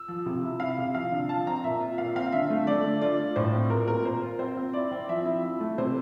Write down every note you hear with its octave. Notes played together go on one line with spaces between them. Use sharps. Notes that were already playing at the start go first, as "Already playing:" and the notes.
Already playing: E6
F3
C3
E4
E4 F5
C3
F3 F5
D3
F3 A5
C4 A#5
A#2 E5
F4
A#2 F5
C4 F5
D3 E5
A3
A3 D5
D3
F4 D5
F4
A2 C5
C4
A#2 A#4
A#2 A#4
A#2 C5
F4
C4 C5
C4
E4 D5
C4
F3 E5
E4
E4
A3
C3 C5